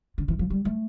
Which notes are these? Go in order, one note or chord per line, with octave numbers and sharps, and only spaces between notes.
D3
E3
F3
G3
A3